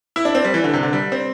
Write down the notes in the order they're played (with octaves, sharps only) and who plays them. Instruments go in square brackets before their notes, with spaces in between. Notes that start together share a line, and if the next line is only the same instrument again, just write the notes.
[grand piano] E4
D4
C4
G3
E3
D3
C3
D3
G3
C4